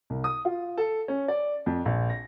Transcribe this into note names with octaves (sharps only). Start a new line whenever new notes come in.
C2
D#6
F4
A4
C#4
D5
F2
A#1
A#6